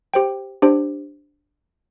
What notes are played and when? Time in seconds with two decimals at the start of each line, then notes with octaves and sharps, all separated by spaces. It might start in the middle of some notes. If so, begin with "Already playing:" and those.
0.14 G4 C5 G5
0.62 D4 G4 C5